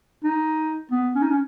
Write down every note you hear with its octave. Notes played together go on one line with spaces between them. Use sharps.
D#4
B3
C#4
D#4
C#4